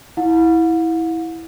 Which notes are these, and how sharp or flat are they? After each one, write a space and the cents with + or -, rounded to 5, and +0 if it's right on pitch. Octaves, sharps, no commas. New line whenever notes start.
E4 -15 F#5 -45